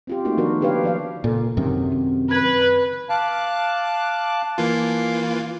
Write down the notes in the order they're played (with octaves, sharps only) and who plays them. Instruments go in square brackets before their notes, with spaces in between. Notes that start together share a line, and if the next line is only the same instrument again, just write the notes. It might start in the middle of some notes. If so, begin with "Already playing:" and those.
[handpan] C4 F4 G4
A3 A#3 D#4 F#4
D#3 F3 B3 D4 F#4 A#4
D3 D4 G4 B4 C#5 F5
F3 D5 F5
[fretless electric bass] A#2 [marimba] C#3 A4
[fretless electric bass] F#2 C3 D#3
[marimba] C4
[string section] B4 [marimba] G#6
[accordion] F5 A5 D6 F#6
[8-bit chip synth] E3 A#3 F4